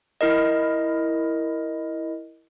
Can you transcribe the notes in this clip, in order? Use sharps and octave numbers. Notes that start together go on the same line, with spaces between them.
E4 A#4 D#5